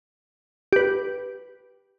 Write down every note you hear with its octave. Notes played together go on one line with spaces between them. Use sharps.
G4 B4